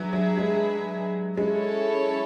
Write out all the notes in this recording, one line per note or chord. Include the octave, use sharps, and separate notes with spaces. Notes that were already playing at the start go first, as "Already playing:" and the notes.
Already playing: F#3 D4 G#4 B4 E5
F#3
G#3
G#3 C#4 E4 A4 C#5